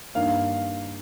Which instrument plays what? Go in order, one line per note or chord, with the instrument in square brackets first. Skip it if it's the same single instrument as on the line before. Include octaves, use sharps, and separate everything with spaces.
[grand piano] G2 D#3 A#3 F5